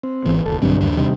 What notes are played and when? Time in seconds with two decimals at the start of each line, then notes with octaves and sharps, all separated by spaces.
0.03 C4
0.25 G#1 E3 B3
0.46 F#1 D#2 A4
0.62 B1 G2 D3 F#3 C4
0.81 D#2 D4
0.97 C3 D#3 G3